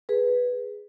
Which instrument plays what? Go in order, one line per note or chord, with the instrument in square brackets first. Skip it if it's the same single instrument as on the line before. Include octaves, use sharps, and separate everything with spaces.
[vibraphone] G#4 B4